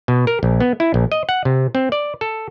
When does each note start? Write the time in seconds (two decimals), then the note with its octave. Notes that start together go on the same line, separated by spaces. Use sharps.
0.08 B2
0.27 A#4
0.43 A#1
0.60 B3
0.80 E4
0.94 A#1
1.12 D#5
1.29 F#5
1.45 C3
1.75 C4
1.92 D5
2.21 A4